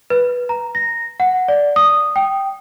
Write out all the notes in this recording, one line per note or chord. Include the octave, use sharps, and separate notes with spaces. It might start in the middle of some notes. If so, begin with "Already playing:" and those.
B4
A#5
A#6
F#5
D5
D#6
G5